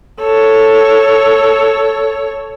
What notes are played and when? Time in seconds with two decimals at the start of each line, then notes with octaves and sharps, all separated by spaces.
0.19 A4 C#5